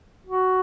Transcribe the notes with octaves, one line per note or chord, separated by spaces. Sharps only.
F#4